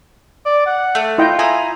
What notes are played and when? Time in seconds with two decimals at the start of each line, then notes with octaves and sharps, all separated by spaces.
0.45 D5
0.66 F#5
0.95 A3
1.18 E4 F4 D#5 G5
1.39 E4 G#5 A#5 D#6